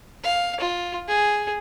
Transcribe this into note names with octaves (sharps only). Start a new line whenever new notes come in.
F5
F4
G#4